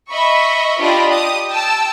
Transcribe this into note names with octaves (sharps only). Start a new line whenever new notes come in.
D#5 E5 B5 C#6
D4 F4 G4 D#5 B5
G4 D#6
G5 A5 E6